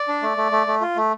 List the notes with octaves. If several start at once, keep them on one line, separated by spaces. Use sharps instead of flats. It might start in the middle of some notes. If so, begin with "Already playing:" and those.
Already playing: D5
D4
A3
A3
A3
A3
F4
A3